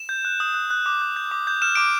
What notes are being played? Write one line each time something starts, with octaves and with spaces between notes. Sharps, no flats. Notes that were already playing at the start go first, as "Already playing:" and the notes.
Already playing: E7
G6
F#6
D#6
F#6
F#6
D6
F#6
G6
D6
G6
F6 E7
D6 D7